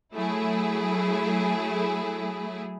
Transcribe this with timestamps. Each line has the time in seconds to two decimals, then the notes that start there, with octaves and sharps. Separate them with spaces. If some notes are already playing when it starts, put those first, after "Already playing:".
0.14 F#3 A3 E4 G#4